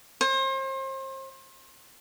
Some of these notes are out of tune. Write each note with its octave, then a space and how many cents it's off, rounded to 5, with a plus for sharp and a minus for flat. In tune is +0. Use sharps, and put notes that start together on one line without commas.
C5 +35